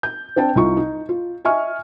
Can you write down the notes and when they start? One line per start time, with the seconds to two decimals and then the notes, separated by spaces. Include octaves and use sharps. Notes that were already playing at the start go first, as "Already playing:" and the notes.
0.03 G6
0.36 C4 D4 G5 A5
0.56 C2 D#4 F4 C#6
0.77 D#4
1.09 F4
1.45 D#5 E5 G#5 C#6 F6